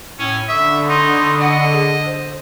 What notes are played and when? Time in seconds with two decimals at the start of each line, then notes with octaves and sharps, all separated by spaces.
0.19 A2 C#4 E4
0.48 D3 E5 B5 C#6 D#6
0.90 D#4 C6
1.41 D#5 F#5
1.73 G#4
2.05 C5